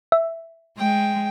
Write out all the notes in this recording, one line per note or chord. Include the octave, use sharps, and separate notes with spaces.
E5
G#3 G5